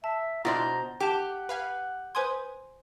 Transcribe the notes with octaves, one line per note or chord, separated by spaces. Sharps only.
E5 A5
B2 D4 E4 F4 C5 A#5
G4 F#5 G5 A5 D6
B4 F5 G#5
B4 C5 G#5 C6 D#6 G#6